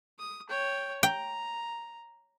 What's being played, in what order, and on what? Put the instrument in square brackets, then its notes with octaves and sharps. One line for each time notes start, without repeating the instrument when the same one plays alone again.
[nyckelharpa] D#6
C#5 G5
[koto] G5 [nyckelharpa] A#5